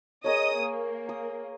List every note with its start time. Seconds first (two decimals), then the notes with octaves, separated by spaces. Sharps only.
0.24 G#4 A#4 C#5 D#5 D#6
0.60 A#3
1.09 D#6